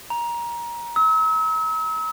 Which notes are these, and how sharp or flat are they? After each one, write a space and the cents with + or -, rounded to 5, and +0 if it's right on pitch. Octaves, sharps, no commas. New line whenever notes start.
A#5 +20
E6 -40